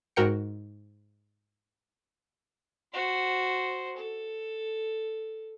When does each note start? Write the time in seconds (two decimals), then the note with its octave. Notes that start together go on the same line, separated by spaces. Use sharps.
0.16 G#2 F#4 A#4 G5 C#7
2.93 F#4 C5
3.97 A4